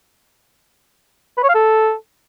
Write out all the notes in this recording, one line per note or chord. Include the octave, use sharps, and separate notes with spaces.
B4
C#5
F5
A4